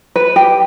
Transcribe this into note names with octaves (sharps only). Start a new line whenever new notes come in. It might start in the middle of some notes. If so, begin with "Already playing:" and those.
B4
G4